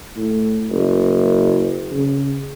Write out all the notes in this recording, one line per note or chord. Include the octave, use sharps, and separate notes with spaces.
A2
F#1
C#3